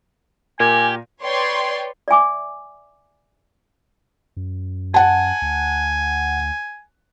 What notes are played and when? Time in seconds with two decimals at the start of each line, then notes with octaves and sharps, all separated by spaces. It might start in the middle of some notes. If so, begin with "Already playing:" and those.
0.60 A#2 G4 A#4 G#5
1.23 B4 C#5 D5 G5 C6
2.08 D5 E5 G#5 D6
4.37 F#2
4.94 F#5 G#5 A5
5.42 D2